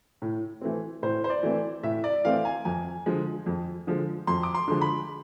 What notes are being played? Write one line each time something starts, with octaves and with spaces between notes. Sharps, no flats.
A2
E3 A3 C4
A2 C5
C5
D5
E3 A3 C4
A2 E5
D5
E3 A3 C4 F5
G#5
F2 G#5
D3 F3 G#3
F2
D3 F3 G#3
F2 C6
D6
C6
D3 F3 G#3
B5